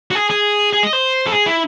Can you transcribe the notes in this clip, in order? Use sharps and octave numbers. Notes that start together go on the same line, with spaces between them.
F#4
G#4
G#4
G#4
D#5
C5
A4
G#4
E4